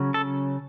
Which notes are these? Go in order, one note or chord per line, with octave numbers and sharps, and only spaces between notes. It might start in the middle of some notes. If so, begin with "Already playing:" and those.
Already playing: C#3 F#3 C#4
A4